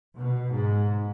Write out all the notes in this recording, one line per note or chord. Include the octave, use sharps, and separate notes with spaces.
B2
G#2